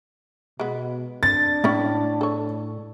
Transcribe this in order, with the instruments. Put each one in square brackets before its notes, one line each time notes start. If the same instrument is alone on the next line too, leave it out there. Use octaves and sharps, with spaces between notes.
[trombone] B2 [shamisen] G#3 B3
[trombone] D4 [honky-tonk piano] A6
[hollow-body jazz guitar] A2 [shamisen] C#4 E4
[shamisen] A4 C#5